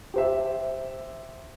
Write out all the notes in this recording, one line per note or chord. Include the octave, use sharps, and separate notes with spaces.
G4 C5 E5